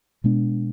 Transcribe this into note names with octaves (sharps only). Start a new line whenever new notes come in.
B2 G#3 B3 D4